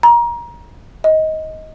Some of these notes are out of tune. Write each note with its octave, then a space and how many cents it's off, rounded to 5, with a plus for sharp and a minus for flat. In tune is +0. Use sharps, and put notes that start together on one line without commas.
A#5 +25
D#5 +15